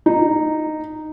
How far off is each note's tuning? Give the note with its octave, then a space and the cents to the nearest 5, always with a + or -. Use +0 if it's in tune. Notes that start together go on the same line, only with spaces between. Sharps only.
D#4 -10